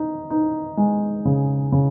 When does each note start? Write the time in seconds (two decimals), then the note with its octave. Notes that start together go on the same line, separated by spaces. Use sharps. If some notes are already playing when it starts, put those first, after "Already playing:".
Already playing: D#4
0.30 D#4
0.77 G#3
1.25 C#3
1.72 C#3